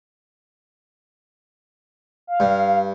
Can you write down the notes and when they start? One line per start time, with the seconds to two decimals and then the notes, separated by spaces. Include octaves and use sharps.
2.27 F5
2.40 G2